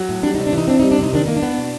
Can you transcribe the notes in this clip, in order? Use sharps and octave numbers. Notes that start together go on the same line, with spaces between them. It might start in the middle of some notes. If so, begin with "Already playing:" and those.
Already playing: F#3
A2
G3 D4
C3 D#4
D4
E3 D#4
C4 D4
G3 D#4
D4
C3 D#4
D#3 D4
A#3 D#4
D4
B3
B2